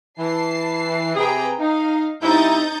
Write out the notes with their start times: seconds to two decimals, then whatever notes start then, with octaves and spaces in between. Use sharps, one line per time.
0.19 E3 A5 C7
1.15 C3 G#4 B4 G5 A#5
1.59 D#4 F5
2.22 G2 C4 D#4 E4 G6 A6